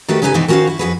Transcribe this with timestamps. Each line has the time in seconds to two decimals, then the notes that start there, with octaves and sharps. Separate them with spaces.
0.08 D#3 A3 F#4 G4 B4 C#5
0.22 C#3 G3 D#4 B4 C5 G#5
0.34 B2 D#3 E3 B3 C4 D#4
0.48 D#3 C#4 F#4 A#4 C5 F5
0.67 E4 F#4
0.79 F2 C3 F#4 G#4 B4